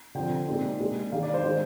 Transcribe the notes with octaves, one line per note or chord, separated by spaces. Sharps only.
D3 F3 C4 G5
A#2 G#3 C4 D#4
A#2 G#3 D4
D#3 G#3 D4 F5
D5
C5
D#3 G#3 D4 C5